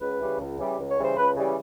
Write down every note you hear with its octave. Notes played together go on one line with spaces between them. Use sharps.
C#2 B4
C#3 E3 G3
C#2
C#3 E3 G3
C#2
C#5
C#3 E3 G3
C5
C#2 B4
C#3 E3 G3